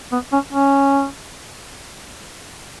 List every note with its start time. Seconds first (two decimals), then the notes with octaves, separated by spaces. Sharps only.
0.12 B3
0.32 C#4
0.52 C#4